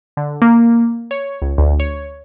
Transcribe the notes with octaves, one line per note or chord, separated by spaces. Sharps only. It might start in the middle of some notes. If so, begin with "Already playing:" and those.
D3
A#3
C#5
C#2
D2
C#5